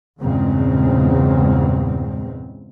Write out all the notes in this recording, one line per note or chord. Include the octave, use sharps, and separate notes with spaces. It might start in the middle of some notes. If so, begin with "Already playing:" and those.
E2 G2 A#2 C#3 G#3 C4